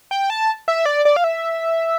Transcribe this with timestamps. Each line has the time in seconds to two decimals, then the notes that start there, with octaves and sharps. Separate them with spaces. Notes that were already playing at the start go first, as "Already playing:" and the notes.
0.11 G5
0.30 A5
0.68 E5
0.86 D5
1.05 D5
1.16 F5
1.24 E5